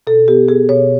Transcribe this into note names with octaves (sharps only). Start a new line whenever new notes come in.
B2 A4
B3 G4
B3 G#4
B2 C#5